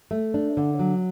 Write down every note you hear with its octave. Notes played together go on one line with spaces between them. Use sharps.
A3
D4
D3
F#3